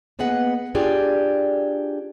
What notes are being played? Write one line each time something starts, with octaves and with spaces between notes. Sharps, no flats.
A#3 B3 G#4 B4 D#5 F#5
D4 F4 G4 G#4 D5